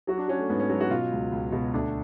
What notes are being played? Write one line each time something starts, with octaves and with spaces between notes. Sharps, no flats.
F#3 F#4
D4
F#3 C#4
A3
G#2 B3
C#4
F#3 B3
F#4
B2 F4
C#2
C#2
B2
D2 D4